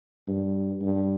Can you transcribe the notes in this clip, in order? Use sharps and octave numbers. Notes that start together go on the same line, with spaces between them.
G2
G2